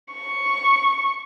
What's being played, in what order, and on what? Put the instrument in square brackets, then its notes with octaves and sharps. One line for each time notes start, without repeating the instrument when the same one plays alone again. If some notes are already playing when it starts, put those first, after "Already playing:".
[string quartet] C#6